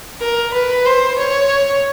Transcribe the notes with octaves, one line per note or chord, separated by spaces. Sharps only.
A#4
B4
C5
C#5